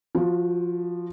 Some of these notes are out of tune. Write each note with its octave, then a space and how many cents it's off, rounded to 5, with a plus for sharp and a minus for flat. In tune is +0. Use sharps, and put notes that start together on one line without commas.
F3 +0 F#4 -20